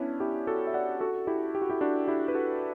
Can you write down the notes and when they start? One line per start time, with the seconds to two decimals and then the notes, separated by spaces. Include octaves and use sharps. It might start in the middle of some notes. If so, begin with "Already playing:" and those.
Already playing: B3 C#4 D4 E4
0.20 E4 G4
0.47 F#4 A4
0.67 E5
0.74 D5 F#5
1.01 F#4 A4
1.27 E4 G4
1.55 G4
1.62 F#4
1.70 E4 G4
1.81 D4 F#4
2.08 E4 G4
2.28 B4
2.35 F#4 A4